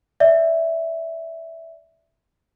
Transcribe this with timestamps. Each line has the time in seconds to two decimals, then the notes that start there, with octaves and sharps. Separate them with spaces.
0.20 D5 E5